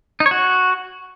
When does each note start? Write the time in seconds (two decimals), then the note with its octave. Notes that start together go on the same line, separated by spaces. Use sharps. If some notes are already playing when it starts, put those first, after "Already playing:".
0.20 D#4
0.26 C#5
0.31 F#4